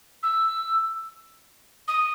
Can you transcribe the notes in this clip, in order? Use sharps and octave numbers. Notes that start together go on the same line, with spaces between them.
E6
D#6